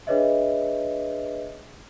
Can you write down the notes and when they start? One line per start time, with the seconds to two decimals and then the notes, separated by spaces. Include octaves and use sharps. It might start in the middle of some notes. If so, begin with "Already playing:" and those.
0.07 D4 G#4 B4 C#5 D#5 E5